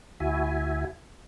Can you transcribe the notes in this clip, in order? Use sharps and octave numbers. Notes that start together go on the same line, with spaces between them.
D2 E4 F#4 E5 G#5